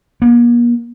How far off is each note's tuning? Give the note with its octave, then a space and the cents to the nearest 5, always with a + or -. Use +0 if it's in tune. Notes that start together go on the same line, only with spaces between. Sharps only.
A#3 +40